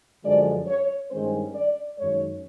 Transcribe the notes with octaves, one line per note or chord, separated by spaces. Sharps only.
F#2 D3 F3 G#3 D5
C#5
G2 D#3 G#3 C#4 C5
D5
F#2 D#3 G#3 C#5